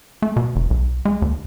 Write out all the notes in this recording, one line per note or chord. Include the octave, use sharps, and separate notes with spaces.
A3
B2
F1
B1
G#3
D#2